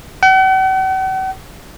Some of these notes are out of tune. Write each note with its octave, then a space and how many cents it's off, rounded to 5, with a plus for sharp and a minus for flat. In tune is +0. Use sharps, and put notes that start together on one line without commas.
F#5 +45